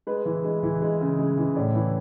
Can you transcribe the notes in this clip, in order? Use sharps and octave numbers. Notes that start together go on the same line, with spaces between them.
G#3 B4
E3
G#3
E3
G#3
C#3
G#3
E3
A2 D5
E3